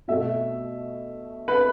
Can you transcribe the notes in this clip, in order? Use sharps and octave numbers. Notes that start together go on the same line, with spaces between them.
B2 A3 E5
B4